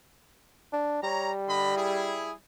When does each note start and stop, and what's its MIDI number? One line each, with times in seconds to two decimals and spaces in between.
0.73 0.99 62
1.03 2.40 55
1.03 1.30 73
1.03 1.30 82
1.48 1.75 50
1.48 1.75 75
1.48 1.75 83
1.76 2.31 64
1.76 2.31 68